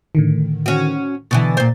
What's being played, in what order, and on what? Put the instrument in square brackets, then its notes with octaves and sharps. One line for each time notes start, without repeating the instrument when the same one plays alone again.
[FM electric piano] A2 D3 D#3
[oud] C#4 F#4
[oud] B2 D3 E3 [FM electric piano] A6
[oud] A#2 C5